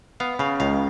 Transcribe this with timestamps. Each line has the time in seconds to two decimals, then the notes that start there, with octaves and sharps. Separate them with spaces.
0.20 B3 F5
0.39 C#3 F5
0.60 C#2 F5